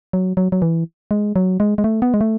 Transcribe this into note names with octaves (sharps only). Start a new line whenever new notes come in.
F#3
F#3
F#3
E3
G#3
F#3
G#3
G#3
A3
B3
G#3
A3